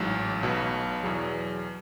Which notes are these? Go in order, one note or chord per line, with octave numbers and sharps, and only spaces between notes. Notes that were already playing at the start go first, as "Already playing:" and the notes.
Already playing: A1 G#2 F#3
B1 B2 F#3
E2 B2 F#3 G#4